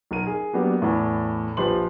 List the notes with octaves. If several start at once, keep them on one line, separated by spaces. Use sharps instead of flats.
B1 A#4 D#7
G#4
F#3 A#3 B3 D4 F#4 G4
E2 A2
A#1 F3 G4 B4 C6 F#7